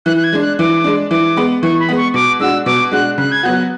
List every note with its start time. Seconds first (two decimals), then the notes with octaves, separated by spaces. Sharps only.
0.06 E3 F#6
0.17 F#6
0.24 G#6
0.33 G#3 D4
0.41 F#6
0.59 E3 D6
0.84 G#3 D4
1.10 E3 D6
1.37 G#3 B3
1.63 E3 C#6
1.80 B5
1.89 G#3 B3
1.97 C#6
2.14 B2 D6
2.40 G#3 D4 F#4 E6
2.66 B2 D6
2.91 G#3 D4 F#4 F#6
3.18 C#3 F#6
3.32 G#6
3.43 F#3 B3 F#4 F#6